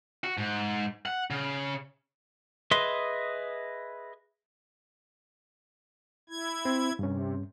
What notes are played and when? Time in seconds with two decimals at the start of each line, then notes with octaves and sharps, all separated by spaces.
0.24 F#4
0.38 G#2
1.06 F#5
1.31 C#3
2.71 G#4 B4 D#5 E5 C6
6.29 E4 G#6
6.65 C4
6.99 G2 C3 C#4